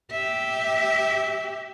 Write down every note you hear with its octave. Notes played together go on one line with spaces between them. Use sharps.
G4 E5